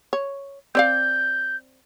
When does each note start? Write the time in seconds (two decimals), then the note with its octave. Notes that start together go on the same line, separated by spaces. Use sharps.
0.13 C#5
0.75 C4 D5 F5 G6